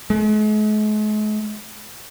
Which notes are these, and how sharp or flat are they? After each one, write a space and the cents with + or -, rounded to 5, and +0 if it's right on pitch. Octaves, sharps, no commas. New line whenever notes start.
G#3 +45